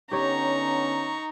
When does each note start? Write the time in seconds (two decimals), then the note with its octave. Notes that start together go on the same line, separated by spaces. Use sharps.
0.11 D3 B3 C#4 D#4 G4 C#5 A#5 C#6